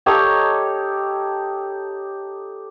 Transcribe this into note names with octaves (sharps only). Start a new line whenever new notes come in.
D#4 G4 A4 C#5